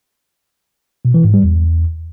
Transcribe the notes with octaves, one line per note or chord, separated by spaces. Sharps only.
B2
E3
G#2
G3
E2